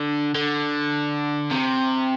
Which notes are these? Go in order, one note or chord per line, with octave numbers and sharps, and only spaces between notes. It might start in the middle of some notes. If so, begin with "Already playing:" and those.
Already playing: D3
D3
C3